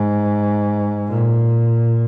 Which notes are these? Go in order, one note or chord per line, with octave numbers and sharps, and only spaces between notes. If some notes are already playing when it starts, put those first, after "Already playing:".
Already playing: G#2
A#2